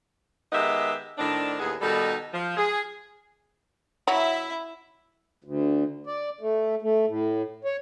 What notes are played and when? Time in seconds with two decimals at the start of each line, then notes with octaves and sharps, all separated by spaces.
0.53 D#3 G#3 B3 G4 D#5 E5
1.18 A2 D#3 C4 D4
1.60 D#2 A2 B3 G#4
1.81 B2 D#3 G3 D#4 A4
2.34 F3
2.57 G#4
4.08 F#3 E4 E5
5.44 D2
6.07 D5
6.41 A3
6.82 A3
7.08 A2
7.65 C#5